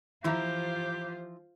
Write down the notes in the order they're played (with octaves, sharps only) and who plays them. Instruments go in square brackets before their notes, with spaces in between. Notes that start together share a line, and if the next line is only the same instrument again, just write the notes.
[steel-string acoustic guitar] E3 F3 [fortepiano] E4 A#5 [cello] F4 C5 [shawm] G4